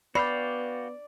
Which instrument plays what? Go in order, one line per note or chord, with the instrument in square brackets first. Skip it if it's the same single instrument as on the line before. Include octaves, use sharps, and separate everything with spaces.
[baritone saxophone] B3 [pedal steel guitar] F#4 F5 G5 [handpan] D5 [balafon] B5